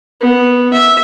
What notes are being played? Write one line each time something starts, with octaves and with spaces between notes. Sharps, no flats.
B3
E5